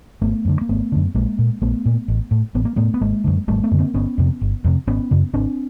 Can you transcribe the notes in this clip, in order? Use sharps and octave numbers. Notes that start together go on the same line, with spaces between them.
G#1 A3 B3
F#2 D3
A#3
G#1 A3 B3
F#2 D3
A#1 G#3 A#3
A#2
A#1 A3 B3
A#2
A1
A2
A1 B3
A#3
A2 A3 B3
B3
G#1 G#3 A#3
F#2 D3
G#1 G3 A3
A3 B3
F#2 D3
A#3 C4
G1 B3 C#4
F2 C3
G1
F2 C3
G#1 B3 C#4
F#2 C#3
G#1 C4 D4